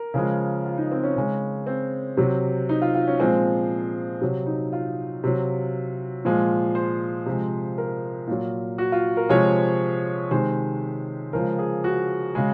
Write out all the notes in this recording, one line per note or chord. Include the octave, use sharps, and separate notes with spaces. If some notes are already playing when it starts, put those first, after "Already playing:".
Already playing: A#4
C#3 F3 G#3
F4
D#4
C4
C#4
C#3 G#3
C4
C3 F#3
D#4
F4
F4
C#4
A#2 F3 G#3 C4
C3 F#3
D#4
F4
C3 F#3
A#2 F3 G#3
C5
C3 F3 G#3
A#4
A#2 F#3
F#4
F4
A#4
C3 F3 G#3 C#5
C3 D#3 G#3 C5
C#3 F3 G#3 A#4
G#4
F#4
C#3 G#3